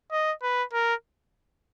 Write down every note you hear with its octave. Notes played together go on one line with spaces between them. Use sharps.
D#5
B4
A#4